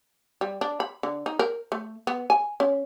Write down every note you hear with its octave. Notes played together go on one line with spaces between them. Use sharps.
G3
D4
B5
D3
D#4
A#4
A3
B3
G#5
C#4